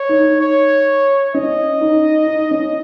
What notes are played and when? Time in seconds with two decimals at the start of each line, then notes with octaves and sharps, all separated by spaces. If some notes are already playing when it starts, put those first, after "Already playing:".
Already playing: C#5
0.09 D#4
0.40 C#5
1.34 C#4 D#5
1.81 D#4
2.27 D#4
2.51 C#4